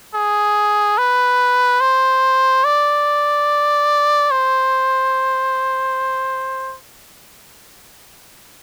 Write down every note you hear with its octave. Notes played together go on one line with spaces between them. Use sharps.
G#4
B4
C5
D5
C5